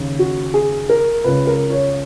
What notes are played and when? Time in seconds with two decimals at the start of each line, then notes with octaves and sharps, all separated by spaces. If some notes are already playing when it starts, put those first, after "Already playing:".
Already playing: D#2 C#3
0.19 F#4
0.54 G#4
0.89 A#4
1.24 C#2 C#3 B4
1.47 A#4
1.70 C#5